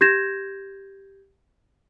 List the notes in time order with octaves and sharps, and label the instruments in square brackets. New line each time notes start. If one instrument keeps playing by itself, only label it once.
[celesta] G4 G6 G#6 A#6 E7